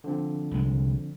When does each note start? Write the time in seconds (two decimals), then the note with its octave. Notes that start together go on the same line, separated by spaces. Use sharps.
0.04 D3 F3 C4
0.51 C2 G#3